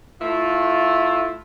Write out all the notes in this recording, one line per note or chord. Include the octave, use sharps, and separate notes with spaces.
A3 E4 F4